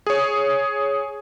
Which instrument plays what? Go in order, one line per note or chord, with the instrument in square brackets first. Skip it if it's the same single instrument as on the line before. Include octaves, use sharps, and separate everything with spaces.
[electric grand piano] G#4 C#5